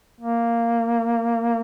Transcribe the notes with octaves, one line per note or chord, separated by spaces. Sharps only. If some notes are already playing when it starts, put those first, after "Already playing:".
A#3